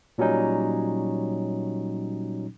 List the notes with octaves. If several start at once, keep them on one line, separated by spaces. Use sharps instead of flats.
A#2 F#3 G3 C#4 D#4